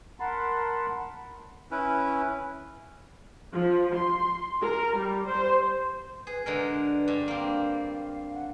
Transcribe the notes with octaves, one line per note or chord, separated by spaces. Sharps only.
A#4 F#5 A5 B5 C6
C#4 E4 B4
F3
C6
A#4
G3
C5
G#4 B4
D3 G#3 A#4 B4
G2
A#3 C4 F5
F#5